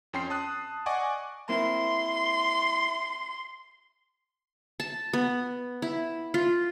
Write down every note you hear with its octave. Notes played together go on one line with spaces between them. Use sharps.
F2 C#4 G5 C6 C7
A5 D#6 F#6
D5 D#5 F#5 G#5 C#6 D6
A#3 C4 E4 C6
A5
B3
E4
F4